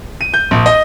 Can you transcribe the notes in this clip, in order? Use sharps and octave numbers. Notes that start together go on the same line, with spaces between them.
D#7
G6
A#1
D#5